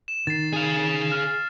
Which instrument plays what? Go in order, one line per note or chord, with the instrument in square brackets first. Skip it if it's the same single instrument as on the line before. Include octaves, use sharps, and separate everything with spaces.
[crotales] E7
[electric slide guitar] D#3 [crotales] A6 C7
[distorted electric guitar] G#4 F5
[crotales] F6